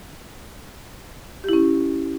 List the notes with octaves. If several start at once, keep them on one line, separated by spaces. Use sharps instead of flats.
C#4 E4 G4